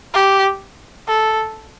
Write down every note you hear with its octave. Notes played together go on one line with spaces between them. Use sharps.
G4
A4